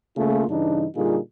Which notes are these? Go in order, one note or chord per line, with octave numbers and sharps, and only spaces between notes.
C#3 A3 A#3 F4
G2 C#3 E3 D4 D#4
A#2 D3 G3 D#4 F4 G#4